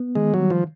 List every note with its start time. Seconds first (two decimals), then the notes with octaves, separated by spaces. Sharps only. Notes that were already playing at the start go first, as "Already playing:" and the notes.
Already playing: B3
0.15 D#3 G#3
0.34 F#3
0.39 G3
0.50 F3